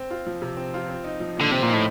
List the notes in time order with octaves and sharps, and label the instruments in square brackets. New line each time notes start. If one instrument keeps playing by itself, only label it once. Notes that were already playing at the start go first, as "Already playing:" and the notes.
Already playing: [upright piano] C4
F4
F3
C3
C4
F4
C4
D#4
F3
[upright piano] A#2 [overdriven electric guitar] D3
[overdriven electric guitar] C3 [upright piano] C4
[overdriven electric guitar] A#2
[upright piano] D#4
[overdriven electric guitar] A2